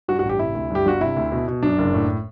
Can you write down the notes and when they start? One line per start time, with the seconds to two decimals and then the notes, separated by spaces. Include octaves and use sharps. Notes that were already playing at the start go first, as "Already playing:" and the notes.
0.08 G2 F#4
0.19 F#4
0.23 A1
0.29 G4
0.39 C3 E4
0.55 D2
0.70 G2 G4
0.86 G1 F#4
1.01 C3 E4
1.16 D2
1.32 B2
1.48 B2
1.63 F#2 D4
1.78 F#1
1.94 A2